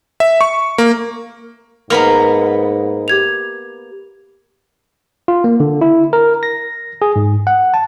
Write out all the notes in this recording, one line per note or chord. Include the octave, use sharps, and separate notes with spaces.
E5
C#6
A#3
G#2 A#3 B3 A#5 B5 F6
G4 G#6 F7
F4
A#3
D3
E4
A#4
A#6
G#4
G#2
F#5
A5